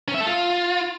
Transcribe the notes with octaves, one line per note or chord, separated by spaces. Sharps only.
C#4
E5
A4
F4